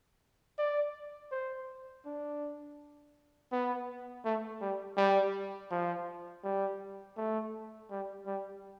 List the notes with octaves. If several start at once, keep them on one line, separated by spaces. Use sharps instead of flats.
D5
C5
D4
B3
A3
G3
G3
F3
G3
A3
G3
G3